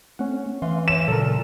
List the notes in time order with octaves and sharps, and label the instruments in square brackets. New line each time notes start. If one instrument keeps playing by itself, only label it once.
[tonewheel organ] A3 C4 [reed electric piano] C#4 F#5
[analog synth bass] E3 [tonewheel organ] E5 F5 C6
[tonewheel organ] C#5 E5 [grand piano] E7
[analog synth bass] A#2 [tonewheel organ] C#3 F#3 [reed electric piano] A4 A#4